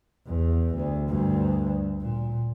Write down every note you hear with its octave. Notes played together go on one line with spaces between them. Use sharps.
E2
D2
D2 G2
A#2